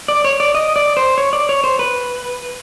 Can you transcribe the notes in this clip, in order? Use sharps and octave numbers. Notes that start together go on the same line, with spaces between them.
D5
C#5
D5
D#5
D5
C5
C#5
D5
C#5
C5
B4